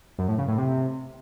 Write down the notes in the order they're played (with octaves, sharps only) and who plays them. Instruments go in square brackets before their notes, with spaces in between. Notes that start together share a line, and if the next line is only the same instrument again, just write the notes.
[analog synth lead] F#2
A2
C#3
A2
C3